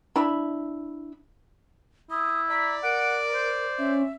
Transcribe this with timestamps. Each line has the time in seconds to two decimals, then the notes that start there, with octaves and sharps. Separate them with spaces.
0.16 D4 E4 E5 B5
2.11 E4 D#6
2.50 D5 A#5 B6
2.83 A#4 F#5 D7
3.33 C5
3.78 C#4 E5